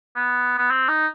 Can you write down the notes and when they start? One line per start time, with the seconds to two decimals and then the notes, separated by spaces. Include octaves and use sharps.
0.16 B3
0.58 B3
0.71 C4
0.89 D#4